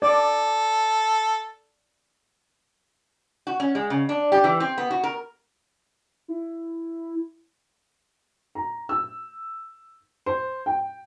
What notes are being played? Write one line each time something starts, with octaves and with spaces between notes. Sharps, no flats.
A4 D5
F#4
C#4
G#3
C#3
D4
G4
E3
C4
B3
F#4
A#4
E4
A#5
E6
C5
G5